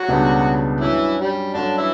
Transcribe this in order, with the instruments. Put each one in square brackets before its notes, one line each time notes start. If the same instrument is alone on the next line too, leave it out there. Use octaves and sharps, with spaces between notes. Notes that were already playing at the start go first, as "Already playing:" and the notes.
Already playing: [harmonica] F#3 F#4
[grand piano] C#2 B2 G3 B3 D4
[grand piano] G2 F#3 C#4 [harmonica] E3 E4
[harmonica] G3
[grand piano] G2 F#3 C#4 [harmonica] D3 D4
[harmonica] E3 E4